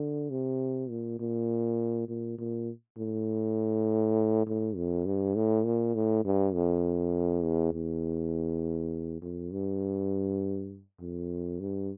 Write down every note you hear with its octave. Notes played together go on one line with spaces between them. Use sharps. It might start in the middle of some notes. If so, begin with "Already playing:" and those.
Already playing: D3
C3
A#2
A#2
A#2
A#2
A2
A2
F2
G2
A2
A#2
A2
G2
F2
E2
E2
F2
G2
F2
G2